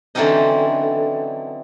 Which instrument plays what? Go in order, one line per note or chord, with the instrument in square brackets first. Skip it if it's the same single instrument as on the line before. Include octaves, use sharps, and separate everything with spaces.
[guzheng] D3 E3 F#3 C4 C#4 D#4